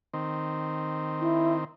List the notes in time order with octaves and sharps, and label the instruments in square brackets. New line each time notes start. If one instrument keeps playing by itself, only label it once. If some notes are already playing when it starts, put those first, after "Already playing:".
[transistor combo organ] D#3 C4
[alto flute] E4